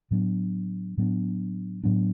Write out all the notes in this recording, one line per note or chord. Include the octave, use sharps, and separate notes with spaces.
A2 F#3 B3 D4
A2 F#3 B3 D4
A2 F#3 B3 D4